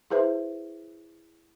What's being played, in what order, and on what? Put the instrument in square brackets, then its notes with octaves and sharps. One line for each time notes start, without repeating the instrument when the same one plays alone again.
[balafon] E4 G#4 B4 C5 E5